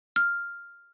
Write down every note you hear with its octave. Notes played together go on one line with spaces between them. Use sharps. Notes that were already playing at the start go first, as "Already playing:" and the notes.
F6